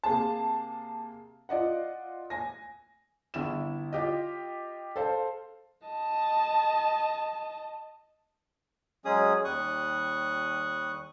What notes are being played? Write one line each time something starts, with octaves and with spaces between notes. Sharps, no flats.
C3 A#3 G#4 A5
F4 D5 D#5 F#5
G#5 A#6
G1 E4 E7
F4 G4 D#5
A4 C5 F5
D#5 A5
F#3 G#3 C#4 G#4 D#6
D#2 G3 C#6 D#6 F#6